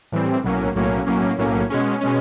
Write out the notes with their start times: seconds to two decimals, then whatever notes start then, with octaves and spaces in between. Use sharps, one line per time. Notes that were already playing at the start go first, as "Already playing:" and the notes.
0.12 A2 E3 G3 C4
0.43 B1 A2 F#3 A#3 C#4
0.75 B1 A2 F#3 A#3 C#4
1.07 B1 A2 F#3 A#3 C#4
1.38 B1 A2 F#3 A#3 C#4
1.70 B2 G#3 C#4
2.01 B2 G#3 C#4